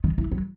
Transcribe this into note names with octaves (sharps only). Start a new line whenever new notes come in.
D#3
E3
F#3